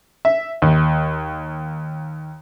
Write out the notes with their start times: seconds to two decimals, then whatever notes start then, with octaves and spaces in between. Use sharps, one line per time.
0.25 E5
0.62 D#2